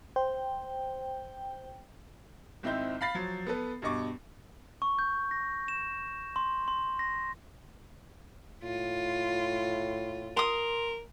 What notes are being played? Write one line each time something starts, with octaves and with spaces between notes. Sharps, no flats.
C5 G5
G#1 C4 D#4 E4 G6
F5 B5 A6 C7
F3 F#3
B3 A4 B4
G2 B2 D#5 C#6 D6
C#6
G6
A#6
E7
C6
C6
A#6
A2 F4
A#4 C6 D#6